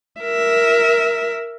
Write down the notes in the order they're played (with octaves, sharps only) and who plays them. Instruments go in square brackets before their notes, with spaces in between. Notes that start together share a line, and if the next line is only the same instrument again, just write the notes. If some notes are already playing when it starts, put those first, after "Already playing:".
[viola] A#4 E5